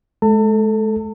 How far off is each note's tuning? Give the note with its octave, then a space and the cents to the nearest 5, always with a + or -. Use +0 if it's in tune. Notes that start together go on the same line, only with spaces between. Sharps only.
G#3 +40 A4 +0 A5 +40